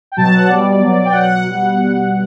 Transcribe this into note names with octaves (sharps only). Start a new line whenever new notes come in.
G5
B2 F#3 A5
F#5
B2 G3 D5
B2 F#3
G5
B2 F#3 F#5
F#5
B2 G3 F#5